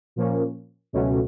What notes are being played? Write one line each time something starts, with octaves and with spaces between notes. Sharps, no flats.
A#2 F3 A#3 C#4
C#2 B2 F#3 A3 C#4